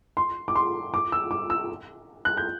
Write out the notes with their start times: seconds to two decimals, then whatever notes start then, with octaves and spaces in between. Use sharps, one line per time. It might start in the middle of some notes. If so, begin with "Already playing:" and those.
0.17 C6
0.48 D6
0.55 C6
0.94 D6
1.12 E6
1.31 D6
1.50 E6
2.25 F#6
2.37 G6